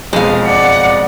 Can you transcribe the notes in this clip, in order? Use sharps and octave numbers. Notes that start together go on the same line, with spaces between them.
E1 F2 B2 G#3 F5
D5 F#5